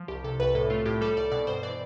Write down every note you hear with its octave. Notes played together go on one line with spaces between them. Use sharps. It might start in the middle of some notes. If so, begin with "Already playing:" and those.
Already playing: F3
C2 G4
C3 A4
C2 B4
A2 A4
A3 F4
A2 G4
G3 A4
C2 D5
B2 D5
G2 C5
E3 D5